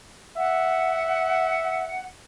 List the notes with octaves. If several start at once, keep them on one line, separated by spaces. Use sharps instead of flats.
E5 F#5